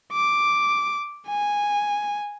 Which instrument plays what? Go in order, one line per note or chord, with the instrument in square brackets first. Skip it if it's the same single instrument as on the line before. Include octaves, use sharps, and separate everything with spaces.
[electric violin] D6
G#5